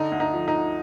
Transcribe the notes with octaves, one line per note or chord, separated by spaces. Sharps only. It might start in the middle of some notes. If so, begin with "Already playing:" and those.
Already playing: D3 D#4
D2
D#4
F3
D#4
D2